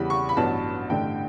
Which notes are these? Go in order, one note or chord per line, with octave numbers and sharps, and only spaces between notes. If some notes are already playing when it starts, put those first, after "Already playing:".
Already playing: E2 C#3 E3 G3 B5
C#6
B5
A1 G2 F#3 B3 A5
A1 G2 D3 A3 G5